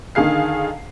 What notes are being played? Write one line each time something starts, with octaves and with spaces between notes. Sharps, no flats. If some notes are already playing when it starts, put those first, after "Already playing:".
D3 D#3 G#4 F5 C7